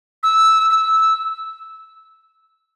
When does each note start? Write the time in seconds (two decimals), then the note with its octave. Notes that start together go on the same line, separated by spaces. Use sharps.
0.23 E6
0.71 E6